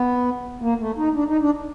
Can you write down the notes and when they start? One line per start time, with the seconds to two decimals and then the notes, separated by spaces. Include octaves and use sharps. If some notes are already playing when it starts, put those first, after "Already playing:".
Already playing: B3
0.62 A#3
0.79 A3
0.97 D#4
1.15 D4
1.28 D#4
1.41 D4